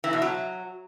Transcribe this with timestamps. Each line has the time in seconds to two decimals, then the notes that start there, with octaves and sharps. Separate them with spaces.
0.04 E3
0.13 B2
0.22 F#3